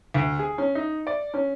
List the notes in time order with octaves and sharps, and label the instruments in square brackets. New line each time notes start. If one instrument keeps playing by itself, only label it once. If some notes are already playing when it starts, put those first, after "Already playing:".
[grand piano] D2
G#4
C#4
D#4
D5
C#4